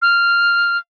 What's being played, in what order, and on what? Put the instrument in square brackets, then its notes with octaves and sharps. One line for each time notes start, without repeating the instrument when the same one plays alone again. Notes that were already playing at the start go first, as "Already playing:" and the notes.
[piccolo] F6